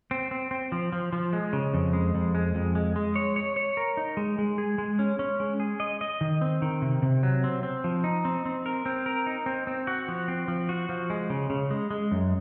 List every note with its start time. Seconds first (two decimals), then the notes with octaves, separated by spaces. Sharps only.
0.11 C4
0.31 C4
0.51 C4
0.72 F3
0.93 F3
1.13 F3
1.33 G#3
1.53 C#3
1.74 F2
1.93 G#3
2.15 F2
2.35 G#3
2.55 F2
2.75 G#3
2.96 G#3
3.16 C#5
3.36 C#5
3.56 C#5
3.77 A#4
3.97 D#4
4.17 G#3
4.38 G#3
4.58 G#4
4.78 G#3
4.99 C#4
5.19 C#4
5.40 G#3
5.60 G#4
5.80 D#5
6.01 D#5
6.21 D#3
6.41 C4
6.62 D#3
6.82 C3
7.02 C3
7.23 F#3
7.44 C4
7.63 C4
7.84 F3
8.04 D#4
8.25 C4
8.46 C4
8.66 A#4
8.86 C4
9.06 A#4
9.27 D#4
9.46 C4
9.67 C4
9.87 F#4
10.08 F3
10.28 C4
10.48 F3
10.69 F#4
10.89 F3
11.10 G#3
11.30 C#3
11.50 C#3
11.71 G#3
11.91 G#3
12.12 F#2